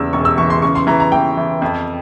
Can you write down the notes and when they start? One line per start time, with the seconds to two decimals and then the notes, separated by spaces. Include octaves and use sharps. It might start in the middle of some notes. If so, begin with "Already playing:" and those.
Already playing: E2 C#3 E6
0.13 E1 C#6
0.25 E6
0.38 E3 C#6
0.50 C6
0.62 C#3 C#6
0.75 C6
0.87 E3 A#5
1.00 A#5
1.12 E3 G5
1.37 E3
1.62 F2